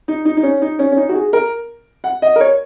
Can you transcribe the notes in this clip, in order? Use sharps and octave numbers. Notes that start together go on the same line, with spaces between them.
D#4
D#4
D#4
C#4
D#4
C#4
C#4
D#4
F#4
G#4
A#4
F#5
D#5
A#4
C#5